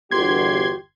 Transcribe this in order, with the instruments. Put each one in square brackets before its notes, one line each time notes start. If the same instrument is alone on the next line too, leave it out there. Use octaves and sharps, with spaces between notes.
[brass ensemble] G1 E2 [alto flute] F#4 [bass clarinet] G4 [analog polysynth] C6 G#6